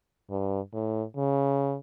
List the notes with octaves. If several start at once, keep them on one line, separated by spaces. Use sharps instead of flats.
G2
A2
C#3